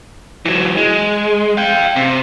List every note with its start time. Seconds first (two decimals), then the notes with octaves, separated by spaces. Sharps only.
0.46 E3 F#3
0.77 G#3
1.57 F5 G5
1.96 C3